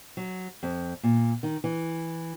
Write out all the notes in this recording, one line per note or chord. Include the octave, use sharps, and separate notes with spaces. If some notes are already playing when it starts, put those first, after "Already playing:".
F#3
F2
A#2
D#3
E3